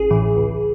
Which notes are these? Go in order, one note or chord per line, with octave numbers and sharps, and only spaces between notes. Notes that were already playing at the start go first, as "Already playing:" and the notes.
Already playing: A1 G#4
A2 E3
C#2